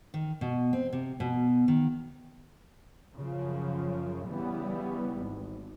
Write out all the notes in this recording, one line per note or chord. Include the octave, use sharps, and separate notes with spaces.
D#3
B2
C4
C3
B2
D#3
F#2 C#3 F3
C#3 E3 G3 B3
G#1